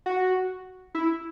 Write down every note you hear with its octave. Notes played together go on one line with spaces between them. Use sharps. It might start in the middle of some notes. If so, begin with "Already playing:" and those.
F#4
E4